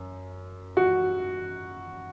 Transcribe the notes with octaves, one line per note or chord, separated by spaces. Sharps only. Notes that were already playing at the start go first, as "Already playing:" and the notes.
Already playing: F#2
F#4